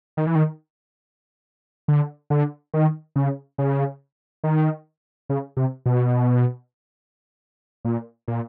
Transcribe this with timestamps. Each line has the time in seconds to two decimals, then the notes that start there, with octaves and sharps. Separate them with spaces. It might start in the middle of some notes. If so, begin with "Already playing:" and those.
0.17 D#3
0.27 E3
0.35 D#3
1.88 D3
2.30 D3
2.74 D#3
3.16 C#3
3.58 C#3
4.44 D#3
5.29 C#3
5.57 C3
5.86 B2
7.85 A#2
8.28 A#2